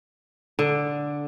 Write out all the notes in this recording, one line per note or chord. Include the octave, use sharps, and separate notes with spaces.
D3